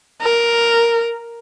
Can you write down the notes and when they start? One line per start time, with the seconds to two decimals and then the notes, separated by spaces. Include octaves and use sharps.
0.22 A#4